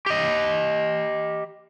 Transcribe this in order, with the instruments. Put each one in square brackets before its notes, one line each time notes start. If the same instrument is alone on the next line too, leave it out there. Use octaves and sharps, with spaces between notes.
[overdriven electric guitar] G4 D#5